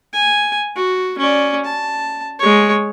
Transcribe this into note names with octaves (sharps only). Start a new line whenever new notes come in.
G#5
F#4
C#4 D5
A5
G#3 C#5